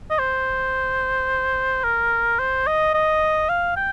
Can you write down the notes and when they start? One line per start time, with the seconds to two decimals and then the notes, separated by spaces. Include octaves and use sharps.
0.10 D#5
0.19 C5
1.84 A#4
2.39 C5
2.67 D#5
2.94 D#5
3.49 F5
3.76 G5